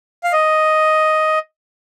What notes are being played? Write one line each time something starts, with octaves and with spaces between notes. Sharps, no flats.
F5
D#5